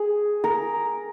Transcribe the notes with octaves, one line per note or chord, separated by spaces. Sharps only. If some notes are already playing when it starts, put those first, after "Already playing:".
Already playing: G#4
A#4